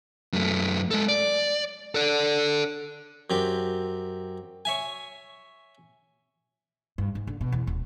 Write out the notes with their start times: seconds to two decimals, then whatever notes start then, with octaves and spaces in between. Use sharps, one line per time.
0.33 F#2 A3
0.91 G#3 A4
1.08 D5
1.95 A4 D5
3.30 F#2 C4 G4
4.65 C#5 E5 G#5
6.98 G2
7.15 G#2
7.27 D3
7.41 B2
7.52 E2
7.67 D#1